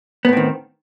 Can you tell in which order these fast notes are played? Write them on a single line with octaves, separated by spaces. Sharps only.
B3 A2 C4 D#3